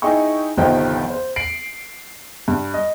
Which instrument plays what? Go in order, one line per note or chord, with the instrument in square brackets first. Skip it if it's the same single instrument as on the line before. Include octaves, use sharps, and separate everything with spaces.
[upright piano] D#4 E4 G#4 G5 C#6
G1 C2 D#3 F3 D#4 G5
C5
C7 D7 F#7
G2
D#5